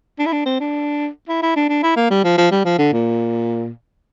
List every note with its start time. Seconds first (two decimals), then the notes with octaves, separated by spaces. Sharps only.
0.19 D4
0.26 E4
0.33 D4
0.46 C4
0.60 D4
1.28 E4
1.42 E4
1.56 D4
1.69 D4
1.83 E4
1.97 A#3
2.10 G3
2.24 F3
2.38 F3
2.51 G3
2.65 F3
2.78 D3
2.93 A#2